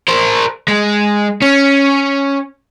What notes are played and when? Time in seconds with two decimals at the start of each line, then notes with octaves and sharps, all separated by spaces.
0.09 A#4 C5
0.68 G#3
1.42 C#4